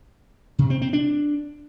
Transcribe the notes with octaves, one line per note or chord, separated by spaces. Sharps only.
C3
C4
C4
D4